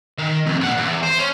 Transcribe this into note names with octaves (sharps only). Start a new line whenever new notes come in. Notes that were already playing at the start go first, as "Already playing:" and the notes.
D#3
C2 F2
A#2 F#5
E2
C5
C#4